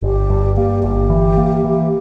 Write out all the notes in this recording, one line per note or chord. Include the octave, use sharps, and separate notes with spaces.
G1 G4
G2
A#3 G4
G1 G4
E3
A#3
E3